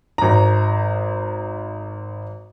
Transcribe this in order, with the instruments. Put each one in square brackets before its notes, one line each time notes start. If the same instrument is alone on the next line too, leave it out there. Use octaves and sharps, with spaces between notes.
[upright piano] G#1 A#5